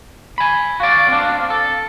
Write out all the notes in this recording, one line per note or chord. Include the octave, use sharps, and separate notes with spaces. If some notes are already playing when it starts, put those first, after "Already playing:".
G#5 B5
F#4 D5 F5
C4 D4
A4